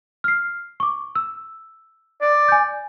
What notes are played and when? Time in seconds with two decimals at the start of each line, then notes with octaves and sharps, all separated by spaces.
0.24 F6 C7
0.80 C#6 D6
1.15 E6
2.21 D5
2.48 G#5 G6